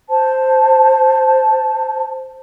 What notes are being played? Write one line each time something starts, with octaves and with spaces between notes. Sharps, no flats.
C5 A5